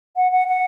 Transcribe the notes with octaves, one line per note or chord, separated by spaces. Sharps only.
F#5
F#5
F#5